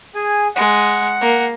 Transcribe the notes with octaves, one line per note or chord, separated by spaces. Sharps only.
G#4 G#5
G#3 F#5
A#3